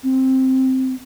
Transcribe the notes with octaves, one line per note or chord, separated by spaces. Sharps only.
C4